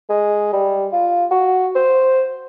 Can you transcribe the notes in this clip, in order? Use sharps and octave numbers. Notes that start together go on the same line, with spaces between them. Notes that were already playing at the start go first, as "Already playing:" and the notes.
G#3
G3
F4
F#4
C5